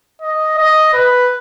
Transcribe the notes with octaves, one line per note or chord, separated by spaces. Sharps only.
D#5
D#5
B4